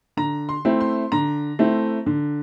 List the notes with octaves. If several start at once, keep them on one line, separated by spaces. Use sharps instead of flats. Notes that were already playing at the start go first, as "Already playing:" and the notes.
D3 A#5
C6
A3 C4 E4
C6
D3 A#5
A3 C4 E4
D3